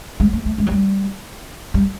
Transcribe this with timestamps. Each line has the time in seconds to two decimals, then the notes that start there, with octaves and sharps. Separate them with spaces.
0.20 G#3
0.33 A#3
0.45 A3
0.58 G#3
0.67 F#3
0.71 G3
1.74 G3